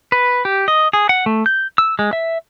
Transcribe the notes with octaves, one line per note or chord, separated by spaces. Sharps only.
B4
G4
D#5
G#4
F#5
A3
G6
E6
G#3
E5